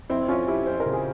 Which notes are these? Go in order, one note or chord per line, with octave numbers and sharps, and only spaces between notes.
F2 C4 E4
F2 C#4 F4
F2 E4 G4
F2 C5
A#4
C#3
G#4